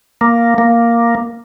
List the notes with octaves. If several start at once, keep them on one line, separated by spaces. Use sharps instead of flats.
A#3
A#3